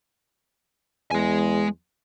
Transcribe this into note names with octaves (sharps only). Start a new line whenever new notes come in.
E2 G#3 G#5